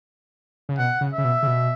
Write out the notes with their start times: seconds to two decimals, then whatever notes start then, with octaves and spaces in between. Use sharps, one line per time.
0.69 C#3
0.78 B2 F#5
1.01 C#3
1.13 C#3 E5
1.24 B2
1.43 C#3
1.47 B2